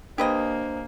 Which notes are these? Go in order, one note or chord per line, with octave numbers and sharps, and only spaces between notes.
A#3 D4 G4 B4 C5 D#5